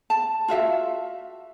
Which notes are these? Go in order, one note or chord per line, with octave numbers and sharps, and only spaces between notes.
A5
F4 F#4 E5 F5